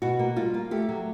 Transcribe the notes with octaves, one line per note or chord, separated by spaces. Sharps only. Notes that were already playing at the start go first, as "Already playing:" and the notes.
B2 F#4
A#3
G3 F4
A#3
A3 G4
F#3